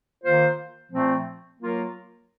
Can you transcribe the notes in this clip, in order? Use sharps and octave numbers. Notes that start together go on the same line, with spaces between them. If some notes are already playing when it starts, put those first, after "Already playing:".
D#3 A#3 F4 C5
A#2 F3 A3 C4
F#3 A#3 F4 A#4